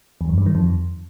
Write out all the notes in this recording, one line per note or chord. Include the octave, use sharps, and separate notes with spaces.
E2
F#2
G2
D#3
F2